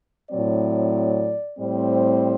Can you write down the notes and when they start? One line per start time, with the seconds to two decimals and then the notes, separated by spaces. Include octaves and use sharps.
0.30 A2 F#3 C4 D5
1.59 A2 G3 C4 C5